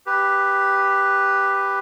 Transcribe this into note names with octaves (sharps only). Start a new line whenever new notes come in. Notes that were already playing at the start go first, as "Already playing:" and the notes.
G4 B4